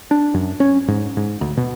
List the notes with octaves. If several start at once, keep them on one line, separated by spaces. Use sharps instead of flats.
D4
F#2
C#4
G#2
G#2
D2
B2